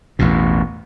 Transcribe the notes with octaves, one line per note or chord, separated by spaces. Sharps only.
A1 E2 B2